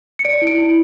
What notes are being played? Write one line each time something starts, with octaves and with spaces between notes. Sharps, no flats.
C#7
D5 D7
E4
D7
E4